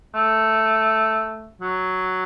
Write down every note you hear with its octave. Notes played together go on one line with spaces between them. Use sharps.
A3
F#3